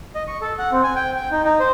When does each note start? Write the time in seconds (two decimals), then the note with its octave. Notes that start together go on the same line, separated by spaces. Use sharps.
0.15 D#5
0.28 C#6
0.41 A4
0.58 F#5
0.72 C4
0.83 G#5
0.96 G5
1.16 G5
1.31 D#4
1.45 D#4
1.60 C5